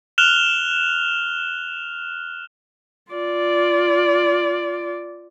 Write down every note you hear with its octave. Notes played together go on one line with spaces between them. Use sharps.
F6 F#6 E7 F7 G7
F4 D5